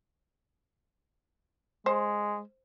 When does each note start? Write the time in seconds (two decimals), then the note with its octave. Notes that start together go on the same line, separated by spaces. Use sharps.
1.86 G#3 C5